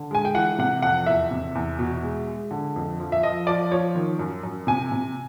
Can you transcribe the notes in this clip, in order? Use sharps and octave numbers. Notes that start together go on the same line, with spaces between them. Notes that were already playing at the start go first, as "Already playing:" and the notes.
Already playing: D3
G#3 G#5
G5
E3 F#5
C3 F#5
F2 F#5
E2 E5
C3
E2
B2
G#3
G#3
D3
F2
F3
E5
F3 D#5
F3 D5
F3 C#5
D#3
F#2
F#2
C3 G#5
C3